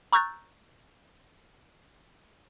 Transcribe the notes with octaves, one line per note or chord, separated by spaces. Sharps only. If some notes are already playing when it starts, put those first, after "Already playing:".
A#5 C#6 E6 F#6 G6 A6